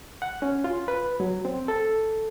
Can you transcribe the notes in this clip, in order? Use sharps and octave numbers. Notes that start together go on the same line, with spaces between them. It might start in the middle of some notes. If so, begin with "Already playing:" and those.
F#5
C#4
F4
B4
F#3
C4
A4